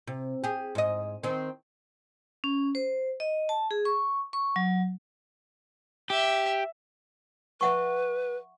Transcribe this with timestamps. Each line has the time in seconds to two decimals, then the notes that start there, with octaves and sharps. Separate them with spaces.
0.07 C3
0.44 G4 G#4
0.75 G#2 D#5
1.23 D#3 C4
2.44 C#4
2.75 C5
3.20 D#5
3.49 A5
3.71 G#4
3.85 C#6
4.33 C#6
4.56 F#3
6.10 G4 E5
7.61 B4 E5 F#5 C#6